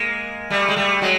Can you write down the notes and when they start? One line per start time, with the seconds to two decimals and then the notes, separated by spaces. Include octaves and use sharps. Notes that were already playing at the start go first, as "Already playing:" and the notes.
Already playing: G#3 A#3
0.50 G3 A3
0.68 G#3
0.76 G3 A3
1.02 F#3 G#3